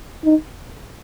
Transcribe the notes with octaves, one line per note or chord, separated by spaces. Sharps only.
D#4